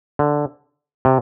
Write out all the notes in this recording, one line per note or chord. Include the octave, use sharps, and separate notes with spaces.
D3
C3